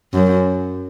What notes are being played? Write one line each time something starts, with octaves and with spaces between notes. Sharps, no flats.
F#2